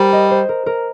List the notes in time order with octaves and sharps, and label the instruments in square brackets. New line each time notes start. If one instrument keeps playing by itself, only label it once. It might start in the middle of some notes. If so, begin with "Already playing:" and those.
Already playing: [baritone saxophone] G3 [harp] A#4 C5
[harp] D#5
C5
A#4
A#4